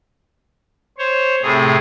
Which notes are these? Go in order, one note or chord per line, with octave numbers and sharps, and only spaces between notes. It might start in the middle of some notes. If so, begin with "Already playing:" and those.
C5 C#5
A2 C3 A3 G#4